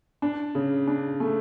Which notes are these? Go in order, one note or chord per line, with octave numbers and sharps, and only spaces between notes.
D4
C#3
D4
A3